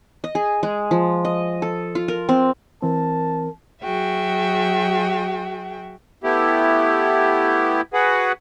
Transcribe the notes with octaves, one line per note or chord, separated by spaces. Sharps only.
D#5
G#4
G#3
F3
D#5
A4
F4
A#4
C4
E3 C4 A#4 A5
F#3 F#4 G#4 E5 G5
A3 B3 E4 G4
F#4 G#4 B4 F#5